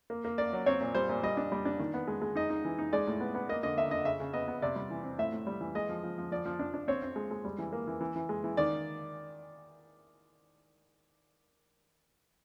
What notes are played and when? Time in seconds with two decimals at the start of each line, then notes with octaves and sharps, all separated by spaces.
0.10 A#3
0.25 A#3
0.38 A#3 D5
0.53 F#3
0.66 C4 C#5
0.80 A#2
0.95 G3 C5
1.09 A#2
1.23 G3 D#5
1.37 D4
1.52 G3
1.65 D4
1.80 D#3
1.94 B3
2.08 G#3
2.22 G#3
2.36 D#4 D#5
2.50 D#4
2.65 E3
2.79 D#4
2.93 G#3 D5
3.07 A2
3.20 B3
3.35 B3
3.49 A#3 D#5
3.63 D3 D#5
3.77 D3 E5
3.91 D3 D#5
4.05 C#3 E5
4.20 C#3
4.34 B3 D#5
4.48 B3
4.62 C3 D5
4.76 G3
4.90 E3
5.04 C4
5.18 A2 E5
5.32 A2
5.47 G3
5.61 E3
5.75 G#3 D#5
5.89 F3
6.03 F3
6.18 F3
6.31 F3 D5
6.45 F3
6.59 D4
6.74 D4
6.88 C4 C#5
7.02 C4
7.16 G#3
7.31 G#3
7.45 G3
7.58 E3
7.73 A#3
7.87 E3
8.00 E3
8.16 E3
8.29 G#3
8.44 E3
8.57 D#3 D5